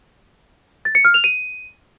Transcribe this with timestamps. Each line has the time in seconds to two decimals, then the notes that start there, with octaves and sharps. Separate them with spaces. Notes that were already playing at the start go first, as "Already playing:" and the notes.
0.85 A6
0.95 C#7
1.05 F6
1.14 F7
1.24 D#7